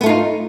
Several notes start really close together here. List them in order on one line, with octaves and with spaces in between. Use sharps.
B3 A3 F4 D#4